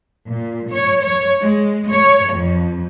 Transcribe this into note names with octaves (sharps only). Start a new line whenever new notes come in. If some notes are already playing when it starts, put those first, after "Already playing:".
A#2
C#5
C#5
G#3
C#5
F2